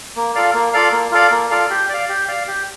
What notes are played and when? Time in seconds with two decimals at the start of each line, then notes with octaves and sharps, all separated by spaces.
0.16 A#3
0.35 F4 A4 D5 F5
0.54 A#3
0.73 F4 A4 D5 F5
0.92 A#3
1.12 F4 A4 D5 F5
1.31 A#3
1.51 F4 A4 D5 F5
1.70 G4
1.89 D5 F5
2.09 G4
2.28 D5 F5
2.47 G4